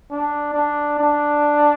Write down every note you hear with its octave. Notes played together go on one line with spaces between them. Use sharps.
D4
D4
D4